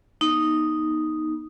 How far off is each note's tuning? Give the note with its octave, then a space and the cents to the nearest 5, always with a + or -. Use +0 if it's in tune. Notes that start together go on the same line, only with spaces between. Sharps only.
B3 -45 D#4 +0